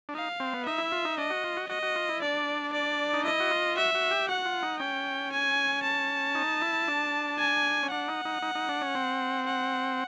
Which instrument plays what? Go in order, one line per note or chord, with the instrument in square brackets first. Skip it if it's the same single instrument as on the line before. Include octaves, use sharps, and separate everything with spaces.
[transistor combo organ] D4
[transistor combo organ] D#4 [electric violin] F5
[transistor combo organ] C4
B3
[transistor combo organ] D#4 [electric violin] E5
[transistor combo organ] E4
F4
D#4
[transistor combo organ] D4 [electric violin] D#5
[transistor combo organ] F#4
F4
F#4
[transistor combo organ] F#4 [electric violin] D#5
[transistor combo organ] F#4
F4
E4
[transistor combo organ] D4 [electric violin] D5
[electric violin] D5
[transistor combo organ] D#4
[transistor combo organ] E4 [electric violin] D#5
[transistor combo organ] F#4
F4
[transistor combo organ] F#4 [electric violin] E5
[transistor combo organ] F#4
G4
[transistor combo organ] F#4 [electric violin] F#5
[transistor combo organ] F4
D#4
[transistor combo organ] C#4 [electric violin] G5
[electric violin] G#5
A5
[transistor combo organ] D#4
E4
D4
[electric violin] G#5
[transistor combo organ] C#4
[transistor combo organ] D4 [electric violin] F#5
[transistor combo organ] D#4
D#4
D#4
D#4
D4
C#4
C4
[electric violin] F#5